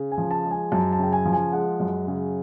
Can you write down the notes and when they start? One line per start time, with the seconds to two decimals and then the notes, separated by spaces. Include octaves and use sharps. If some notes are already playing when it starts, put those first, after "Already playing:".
Already playing: C#3
0.12 G#5
0.18 F3
0.31 A5
0.45 G#3
0.51 G#5
0.72 F#2 A5
0.92 A5
0.99 C#3 G5
1.13 G#5
1.25 F3
1.33 G#5
1.53 G#3 F#5
1.80 F#2
2.07 C#3